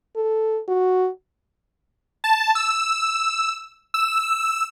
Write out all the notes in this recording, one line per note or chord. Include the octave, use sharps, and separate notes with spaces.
A4
F#4
A5
E6
E6